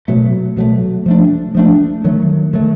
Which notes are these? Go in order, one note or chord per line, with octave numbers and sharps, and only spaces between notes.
B2 F#3 A3
B2 F#3 A3
F3 A3 D4
F3 A3 D4
D#3 F#3 A3
D#3 F#3 A3